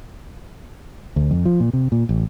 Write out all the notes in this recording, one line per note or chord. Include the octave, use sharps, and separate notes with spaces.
D2
F2
F3
A#2
C3
A#2
A1